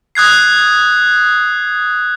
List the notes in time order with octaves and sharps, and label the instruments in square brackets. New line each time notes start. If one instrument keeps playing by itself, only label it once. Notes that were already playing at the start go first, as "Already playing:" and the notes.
[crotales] D#6 F#6 G#6 C7